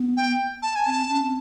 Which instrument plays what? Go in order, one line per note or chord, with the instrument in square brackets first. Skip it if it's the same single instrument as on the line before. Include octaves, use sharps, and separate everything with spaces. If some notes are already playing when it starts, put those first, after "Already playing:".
Already playing: [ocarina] B3
[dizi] G5
A5
G#5
[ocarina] C4 [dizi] A5
[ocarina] C#4
C4